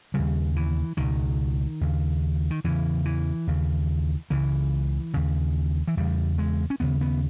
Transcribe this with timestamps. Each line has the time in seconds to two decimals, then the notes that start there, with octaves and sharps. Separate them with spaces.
0.14 C#3 G3
0.19 D#2
0.56 E3
0.97 C#2 B2 D#3
1.81 D#2 C#3
2.50 D#3
2.64 E2 C#3 E3
3.05 E3
3.47 D#2 C#3
4.30 C#2 C#3 E3
5.14 D#2 C#3
5.88 E3
5.97 E2 C#3 G3
6.38 G#3
6.70 C#4
6.80 D#2 C#3 B3
7.01 B3